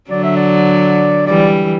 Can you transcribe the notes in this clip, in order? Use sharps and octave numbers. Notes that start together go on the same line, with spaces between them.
D3 F#3 D5
E5
D5
E3 G3 D5